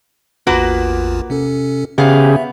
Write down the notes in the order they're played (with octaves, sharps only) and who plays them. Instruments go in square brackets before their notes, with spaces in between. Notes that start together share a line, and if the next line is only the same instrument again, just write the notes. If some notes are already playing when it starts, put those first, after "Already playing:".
[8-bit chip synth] A1 E2 F4 [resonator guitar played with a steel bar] A#3 F#4 B4
[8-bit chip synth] C3 C#4 A4
[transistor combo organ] C#3 G4 G#4 [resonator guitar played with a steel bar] B3 F5 [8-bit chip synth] E5